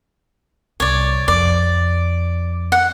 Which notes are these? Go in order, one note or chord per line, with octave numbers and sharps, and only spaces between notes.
C2 C#5 D5
F2 D5
F#5